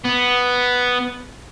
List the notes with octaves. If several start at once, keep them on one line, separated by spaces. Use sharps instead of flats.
B3